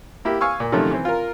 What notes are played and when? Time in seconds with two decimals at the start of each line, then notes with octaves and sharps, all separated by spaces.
0.25 A#3 E4 G4
0.41 F5 G#5 C#6 E6
0.60 A#2
0.72 C3 D#3 F3 F#3 A3 C#4
0.91 E3 C4
1.05 F4 A#4